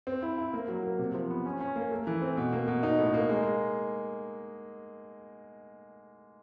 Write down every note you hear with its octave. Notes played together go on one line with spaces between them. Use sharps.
C4
E4
E4
A#3
F#3
A#3
C3
F3
B3
C#4
C#4
A#3
A3
E3
C4
B2
A#3
B2
D#4
A2
A#3
G#3